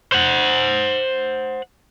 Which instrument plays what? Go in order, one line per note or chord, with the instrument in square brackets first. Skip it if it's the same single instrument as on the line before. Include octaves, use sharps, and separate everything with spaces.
[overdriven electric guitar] C5 F#5